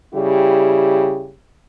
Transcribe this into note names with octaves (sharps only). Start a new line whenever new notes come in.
C#3 G3 E4 G4